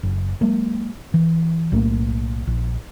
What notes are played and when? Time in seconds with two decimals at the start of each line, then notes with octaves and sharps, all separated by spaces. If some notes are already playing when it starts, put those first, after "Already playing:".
0.03 F#1
0.41 F#3 G#3 A#3
1.14 E3
1.72 B1 A2 A3 A#3
2.47 A#1